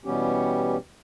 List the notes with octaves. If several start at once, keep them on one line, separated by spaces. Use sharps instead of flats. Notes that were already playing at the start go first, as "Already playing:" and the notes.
B2 E3 G3 B3 C#4 G4